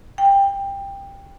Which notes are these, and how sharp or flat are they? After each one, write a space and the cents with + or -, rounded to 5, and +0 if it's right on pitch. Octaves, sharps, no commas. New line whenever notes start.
G5 +15